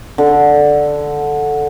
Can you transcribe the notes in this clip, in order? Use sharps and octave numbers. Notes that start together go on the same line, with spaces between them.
D3 A4